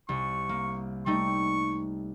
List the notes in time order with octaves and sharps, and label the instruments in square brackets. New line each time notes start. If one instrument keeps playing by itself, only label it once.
[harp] C2 [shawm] C#6
[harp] A#3
[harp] G3 A3 D#4 [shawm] C#6